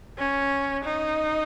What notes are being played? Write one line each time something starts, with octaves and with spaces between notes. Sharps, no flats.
C#4
D#4